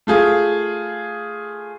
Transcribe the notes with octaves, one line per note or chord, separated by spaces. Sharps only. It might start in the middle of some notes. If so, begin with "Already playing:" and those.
A3 F4 G#4